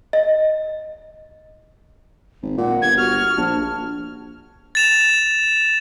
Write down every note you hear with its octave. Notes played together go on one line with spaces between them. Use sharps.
D#5
G#1
A#2 F#5
G1 G#6
F#4 F6
A#1 A5
A6 E7 F7